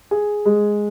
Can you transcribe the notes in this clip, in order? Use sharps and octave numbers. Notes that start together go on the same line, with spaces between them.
G#4
G#3